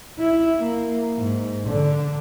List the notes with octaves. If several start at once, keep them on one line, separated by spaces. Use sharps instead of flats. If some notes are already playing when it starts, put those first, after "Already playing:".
E4
A#3
G#2
D3